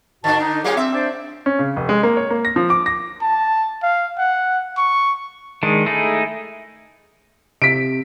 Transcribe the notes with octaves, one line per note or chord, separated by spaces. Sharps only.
G#2 D3 D4 F#4 A5
D#4
F#3 A#3 F4 G#4 C#5
C4 E5
D4 C5 D5
C#4
C#3
F1
G#3
A#3
C#5
A#3
A#6
F3
D6
A#6
A5
F5
F#5
C#6
D#3 G#3 D4
A3 D#4 E4 G#4
C3 B6 D7